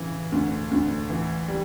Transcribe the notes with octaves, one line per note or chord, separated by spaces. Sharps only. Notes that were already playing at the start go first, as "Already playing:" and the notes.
Already playing: C#3 E3
D2
D2
E3
G3